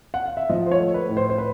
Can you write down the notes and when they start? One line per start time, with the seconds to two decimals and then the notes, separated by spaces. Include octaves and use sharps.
0.14 F#5
0.26 F5
0.37 E5
0.49 F3 D#5
0.66 C5
0.72 C#5
0.80 A3
0.94 B4
1.09 A2
1.17 C5
1.30 C5
1.38 B4